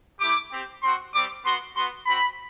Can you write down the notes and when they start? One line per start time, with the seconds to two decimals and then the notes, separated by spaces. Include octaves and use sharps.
0.19 A3 E4 G4 D6
0.51 C4 G4
0.82 C4 F#4 C6
1.13 G3 C4 G4 D6
1.44 B3 F#4 C6
1.75 B3 F#4 C6
2.06 C4 F#4 B5